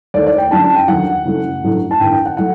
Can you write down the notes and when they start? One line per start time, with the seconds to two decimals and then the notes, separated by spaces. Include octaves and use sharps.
0.14 D#2 D#3 A3 D5
0.26 D5
0.38 G5
0.51 F#2 D3 F#3 A5
0.64 A5
0.75 G5
0.88 D#2 D3 F#3 F#5
1.26 F#1 F#2 F#3 A3
1.63 A1 G2 F#3 A3
1.91 A5
2.00 A1 G2 D#3 G5
2.13 G5
2.25 F#5
2.37 F#3 A3 F#5